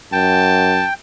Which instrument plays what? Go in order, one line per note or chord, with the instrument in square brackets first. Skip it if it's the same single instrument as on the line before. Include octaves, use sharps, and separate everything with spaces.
[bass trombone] F#2 [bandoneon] G5 [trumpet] A5